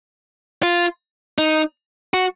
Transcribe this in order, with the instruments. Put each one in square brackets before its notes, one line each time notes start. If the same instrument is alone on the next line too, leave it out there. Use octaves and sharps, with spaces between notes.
[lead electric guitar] F4
D#4
F#4